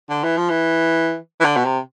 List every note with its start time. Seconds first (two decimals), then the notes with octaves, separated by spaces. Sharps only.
0.10 D3
0.24 E3
0.37 F3
0.49 E3
1.40 E3
1.44 D3
1.56 B2
1.64 C3